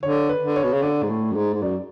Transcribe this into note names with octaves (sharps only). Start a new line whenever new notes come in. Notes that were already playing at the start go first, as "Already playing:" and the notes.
D3 C#5
B4
D3
C#5
B2
C#3
D3 D5
G#2
A2
F#2
G#2
G#2
F#2 D5